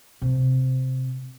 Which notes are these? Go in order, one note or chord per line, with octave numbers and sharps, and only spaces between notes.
C3